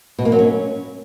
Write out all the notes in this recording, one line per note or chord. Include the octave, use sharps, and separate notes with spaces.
B2
A#3
F#3
C#4